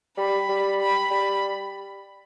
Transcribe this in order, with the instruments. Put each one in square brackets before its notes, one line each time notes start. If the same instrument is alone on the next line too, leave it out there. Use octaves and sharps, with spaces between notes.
[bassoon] G3 [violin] B5
[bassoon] G3
[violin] B5
[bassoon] G3 [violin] B5